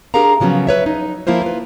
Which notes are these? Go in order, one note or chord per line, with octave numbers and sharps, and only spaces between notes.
D4 G4 G#4 A#4 F5 A#5
C#3 F3 F#3 B3 C#4
B4 C#5 E5
D#4
F3 A#3 E4 F4 C5
F4 B4